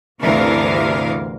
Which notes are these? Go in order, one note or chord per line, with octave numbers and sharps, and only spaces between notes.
G1 D2 C3 E3 A#4 F5